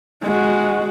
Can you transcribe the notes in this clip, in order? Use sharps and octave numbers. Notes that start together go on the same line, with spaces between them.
G#3 F#4